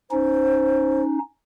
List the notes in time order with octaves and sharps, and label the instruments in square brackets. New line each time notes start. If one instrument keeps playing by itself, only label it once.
[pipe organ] C#4 D#4 [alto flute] C5